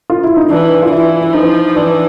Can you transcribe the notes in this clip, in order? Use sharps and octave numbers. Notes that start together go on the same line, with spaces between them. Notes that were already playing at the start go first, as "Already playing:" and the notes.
F4
E4
D#4
E3 D4
F4
E3 E4
E4
F3 D#4
E3 D4